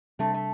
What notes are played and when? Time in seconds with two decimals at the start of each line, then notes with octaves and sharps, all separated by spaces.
0.19 C3 G3 A3 C4 D4
0.34 A3